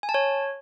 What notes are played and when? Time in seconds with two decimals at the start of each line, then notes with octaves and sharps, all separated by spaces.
0.03 G#5
0.09 A5
0.14 C#5